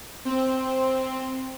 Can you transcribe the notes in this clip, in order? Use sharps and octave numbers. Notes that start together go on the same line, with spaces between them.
C4